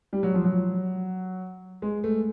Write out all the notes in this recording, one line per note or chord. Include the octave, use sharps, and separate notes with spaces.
G3
F#3
F3
F#3
G#3
A3